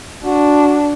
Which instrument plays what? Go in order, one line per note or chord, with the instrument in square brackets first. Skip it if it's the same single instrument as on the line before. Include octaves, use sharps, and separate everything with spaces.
[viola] D4 [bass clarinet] F#4